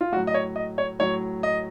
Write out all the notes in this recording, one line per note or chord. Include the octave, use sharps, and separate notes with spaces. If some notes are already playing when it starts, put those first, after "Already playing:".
F4
A2 F#3 F#4
D#5
C#5
D#5
C#5
A2 F#3 C#5
D#5